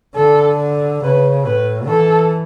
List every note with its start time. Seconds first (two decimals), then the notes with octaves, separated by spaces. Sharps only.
0.16 D3 A4
1.03 C#3 B4
1.45 A2 B4
1.89 E3 A4